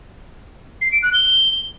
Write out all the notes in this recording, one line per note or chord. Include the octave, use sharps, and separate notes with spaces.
C7
D7
F#6
G7